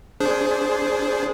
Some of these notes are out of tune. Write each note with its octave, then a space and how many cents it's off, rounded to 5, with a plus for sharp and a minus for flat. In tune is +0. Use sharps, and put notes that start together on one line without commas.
D4 -20 G#4 +10 C5 -5